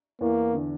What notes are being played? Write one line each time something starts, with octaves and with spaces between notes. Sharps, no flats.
E2 E3 A#3
D3